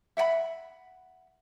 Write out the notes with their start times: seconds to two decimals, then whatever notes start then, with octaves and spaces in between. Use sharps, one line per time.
0.17 E5 F#5 G5 B5